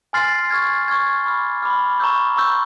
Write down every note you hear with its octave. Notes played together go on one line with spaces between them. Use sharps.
G#5 C6 F6 A6 C7
C#6 F6 G#6
C#6 F6 G#6
B5 D6 F6
B5 D6 F6
A#5 C#6 E6 G6
A#5 C#6 E6 G6